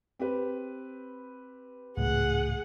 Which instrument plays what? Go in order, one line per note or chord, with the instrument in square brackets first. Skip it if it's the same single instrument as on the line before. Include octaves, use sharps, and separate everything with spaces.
[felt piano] C4 G4 B4
[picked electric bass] G#1 C#2 A2 [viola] G#4 F#5